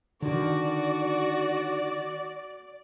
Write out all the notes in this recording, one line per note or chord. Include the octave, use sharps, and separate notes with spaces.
D3 D#3 F#4 D5